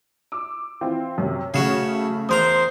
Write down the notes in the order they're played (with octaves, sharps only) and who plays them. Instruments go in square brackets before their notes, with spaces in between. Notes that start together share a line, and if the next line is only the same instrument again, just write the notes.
[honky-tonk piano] D6 E6
E3 C4 F4
F#2 C3
[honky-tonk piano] C#3 F#3 E7 [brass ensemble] A3 [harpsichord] C#4 F#4 G#4
[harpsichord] E2 A#4 A#5 [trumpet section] C5 [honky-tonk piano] D#6